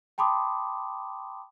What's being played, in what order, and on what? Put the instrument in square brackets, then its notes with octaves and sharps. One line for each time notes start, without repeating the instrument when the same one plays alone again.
[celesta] G5 A5 B5 C6 D6 D#6